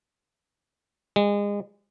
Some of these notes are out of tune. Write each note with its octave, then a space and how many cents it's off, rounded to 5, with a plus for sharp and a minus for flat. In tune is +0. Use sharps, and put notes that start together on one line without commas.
G#3 -30